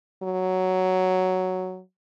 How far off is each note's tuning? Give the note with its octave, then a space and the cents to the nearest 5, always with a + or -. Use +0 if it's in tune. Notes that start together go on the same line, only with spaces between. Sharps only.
F#3 +5